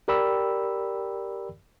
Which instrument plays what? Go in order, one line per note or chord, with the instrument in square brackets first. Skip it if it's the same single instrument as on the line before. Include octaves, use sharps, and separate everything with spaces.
[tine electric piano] G4 A#4 D5 G5 B5 E6